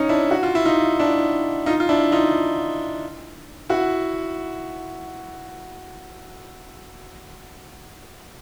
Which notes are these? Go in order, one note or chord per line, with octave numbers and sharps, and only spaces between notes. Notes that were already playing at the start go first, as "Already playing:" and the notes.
Already playing: C#4 D#4
D4 E4
F#4
F4
E4
D#4 F4
D4 E4
D#4 F4
F4
D4 E4
D#4 F4
E4 F#4